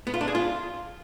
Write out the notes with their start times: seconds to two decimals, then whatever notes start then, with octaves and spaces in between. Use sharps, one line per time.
0.07 B3
0.14 F4
0.21 D4
0.28 G#4
0.35 F4